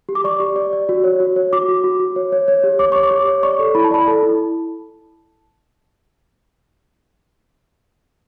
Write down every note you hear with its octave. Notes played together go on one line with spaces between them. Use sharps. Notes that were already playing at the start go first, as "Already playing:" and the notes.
G4
D6
D5 C#6
G4
D5
D5
F#4
C#5
F#4
C#5
F#4 D6
F#4
F#4
F#4
C#5
C#5
C#5
G4
C#5 D6
C#5 C#6
D6
G4
C#5
D5 C#6
A4
E4 B5
A5
D5 B5
A4 A5
E4